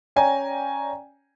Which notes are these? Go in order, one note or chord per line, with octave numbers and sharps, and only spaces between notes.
C#4 D5 G5 G#5 A#5